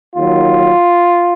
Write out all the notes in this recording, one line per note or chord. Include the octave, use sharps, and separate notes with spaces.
D#2 D#3 F#3 F4